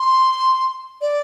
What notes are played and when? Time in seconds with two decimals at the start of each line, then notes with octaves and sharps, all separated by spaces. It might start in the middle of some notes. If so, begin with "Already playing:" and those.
Already playing: C6
1.01 D5